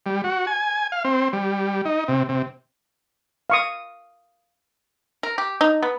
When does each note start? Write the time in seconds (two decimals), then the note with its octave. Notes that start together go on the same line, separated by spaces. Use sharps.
0.06 G3
0.24 F#4
0.47 G#5
0.92 F5
1.05 C4
1.33 G3
1.85 D#4
2.08 C3
2.29 C3
3.50 F5 C#6 D#6
5.23 A#4
5.38 G4
5.61 D#4
5.82 B3